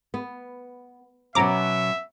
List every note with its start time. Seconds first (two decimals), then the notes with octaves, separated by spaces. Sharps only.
0.14 B3
1.35 B2 F#3 C#4 E5 A#5 D6